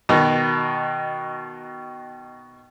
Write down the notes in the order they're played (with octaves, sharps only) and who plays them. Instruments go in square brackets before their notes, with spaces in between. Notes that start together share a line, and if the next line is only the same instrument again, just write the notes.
[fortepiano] B2 D#3